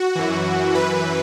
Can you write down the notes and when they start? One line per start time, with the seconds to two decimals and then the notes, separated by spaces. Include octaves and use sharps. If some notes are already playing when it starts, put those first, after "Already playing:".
Already playing: F#4
0.15 F#2 E3
0.74 F#2 E3 B4